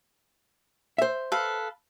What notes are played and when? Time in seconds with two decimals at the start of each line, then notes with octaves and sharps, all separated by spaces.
0.98 C5 E5
1.32 A4 B4 F5